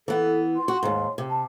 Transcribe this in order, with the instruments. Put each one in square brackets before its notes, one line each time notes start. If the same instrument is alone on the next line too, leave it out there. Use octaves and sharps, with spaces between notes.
[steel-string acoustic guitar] E3 B3 [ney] A4
[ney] C6
[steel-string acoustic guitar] F#4
D#2 G#2
C3
[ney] A5